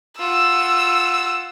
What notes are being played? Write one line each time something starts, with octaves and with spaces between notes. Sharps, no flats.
F4 F#5 E6